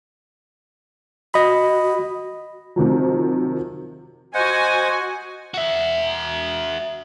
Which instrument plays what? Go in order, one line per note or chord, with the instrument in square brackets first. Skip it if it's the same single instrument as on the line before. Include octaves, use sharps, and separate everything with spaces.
[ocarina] F#4 [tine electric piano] D#5 B5
[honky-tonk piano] C3 D#3 F3 F#3
[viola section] F#4 G#5 [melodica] C5 F#5 [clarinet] D#5
[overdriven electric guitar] F#4 E5